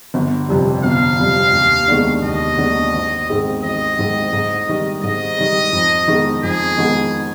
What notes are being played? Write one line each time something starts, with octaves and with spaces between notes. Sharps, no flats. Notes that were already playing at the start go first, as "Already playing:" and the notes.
G1
F2 C3 G3
G1 F5
F2 C3 G3
D#2
D#3 G#3 B3 D4
D#2 D#5
D#3 G#3 B3 D4
G#1
G#2 D#3 G#3 C4
G#1 D#5
G#2 D#3 G#3 C4
G#2
D#3 G3
G#2 D#5
D#3 G3
F2
D#3 G#3 B3
F2 G#4
D#3 G#3 B3